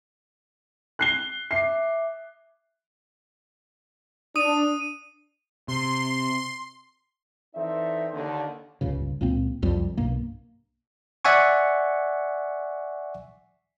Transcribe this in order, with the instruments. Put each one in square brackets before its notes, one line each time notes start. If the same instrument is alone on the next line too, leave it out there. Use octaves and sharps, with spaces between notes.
[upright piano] F#6 C7 G7
[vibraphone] E5 D6 [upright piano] C7
[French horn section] D4 [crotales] D#6 D#7
[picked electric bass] C3 [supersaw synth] C6
[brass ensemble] E3 C4 D#4 A4 D5 E5
D#2 D3
[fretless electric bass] D#1 C#2 G2 C#3
C#2 A#2 A#3 C4
C2 F2 G3
B1 G2 A#3
[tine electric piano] D5 E5 F#5 G#5 C#6